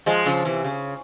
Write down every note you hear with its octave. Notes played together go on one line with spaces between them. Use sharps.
F3 G#3
C#3 F3
C3 E3
C#3